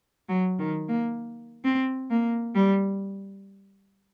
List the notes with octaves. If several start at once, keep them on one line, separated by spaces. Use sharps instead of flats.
F#3
D#3
A#3
C4
A#3
G3